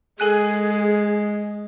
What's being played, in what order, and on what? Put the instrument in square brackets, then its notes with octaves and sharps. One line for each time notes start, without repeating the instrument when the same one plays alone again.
[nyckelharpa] G#3 [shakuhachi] G#4 [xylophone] A4 G#5 F#6